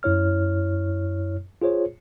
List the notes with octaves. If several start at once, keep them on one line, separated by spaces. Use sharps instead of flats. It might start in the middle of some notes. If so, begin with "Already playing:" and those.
F#2 E4 C#5 F6
F4 G#4 C5 C#5